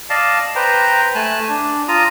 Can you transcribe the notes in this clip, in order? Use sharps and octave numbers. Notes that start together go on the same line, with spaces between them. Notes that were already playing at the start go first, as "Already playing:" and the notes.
D5 D#5 F5 A5
B4 C5 G5 A#5
A3 G#5 A5 F#6
D4
F4 A#5 D#6